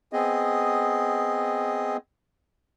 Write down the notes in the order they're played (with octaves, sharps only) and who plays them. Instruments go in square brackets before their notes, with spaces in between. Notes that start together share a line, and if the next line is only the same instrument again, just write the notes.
[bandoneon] B3 C4 G#4 D#5